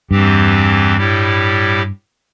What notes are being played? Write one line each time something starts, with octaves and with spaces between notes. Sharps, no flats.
E2 G2 E3 C4 G4
A2 G3 E4 G4